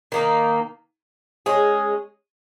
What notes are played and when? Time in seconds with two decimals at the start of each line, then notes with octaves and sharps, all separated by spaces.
0.12 D#3 A#3 D#4
1.46 G#3 C#4 G#4